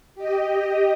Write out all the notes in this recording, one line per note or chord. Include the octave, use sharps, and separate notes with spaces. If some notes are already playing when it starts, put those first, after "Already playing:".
G4 D#5